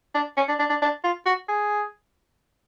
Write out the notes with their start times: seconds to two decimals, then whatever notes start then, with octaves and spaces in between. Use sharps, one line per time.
0.15 D4
0.37 C#4
0.48 D4
0.59 D4
0.70 D4
0.82 D4
1.04 F4
1.26 F#4
1.49 G#4